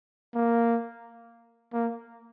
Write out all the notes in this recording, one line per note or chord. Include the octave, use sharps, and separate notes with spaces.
A#3
A#3